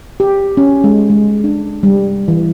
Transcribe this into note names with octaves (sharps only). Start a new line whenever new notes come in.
G4
C#4
G#3
G#3
D4
G3
E3